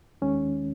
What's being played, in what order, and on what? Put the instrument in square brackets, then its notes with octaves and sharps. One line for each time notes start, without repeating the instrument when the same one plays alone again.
[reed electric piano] D#2 D#3 G#3 C#4